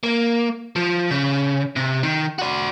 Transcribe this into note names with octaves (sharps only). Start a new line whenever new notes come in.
A#3
F3
C#3
C3
D#3
F#4 D5